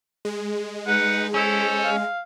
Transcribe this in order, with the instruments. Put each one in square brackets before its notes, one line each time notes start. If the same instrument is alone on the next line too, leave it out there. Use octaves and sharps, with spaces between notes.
[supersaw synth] G#3
[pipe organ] D#4 B4 [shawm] F#5
[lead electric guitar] C#4 [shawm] E4 [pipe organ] A4 C5
[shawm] F5